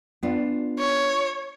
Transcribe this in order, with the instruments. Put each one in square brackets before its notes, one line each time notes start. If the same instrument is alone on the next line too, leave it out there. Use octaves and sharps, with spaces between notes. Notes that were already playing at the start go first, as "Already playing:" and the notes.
[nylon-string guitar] B3 D4 F4
[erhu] C#5